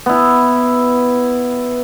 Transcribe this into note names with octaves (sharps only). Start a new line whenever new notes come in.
B3 E4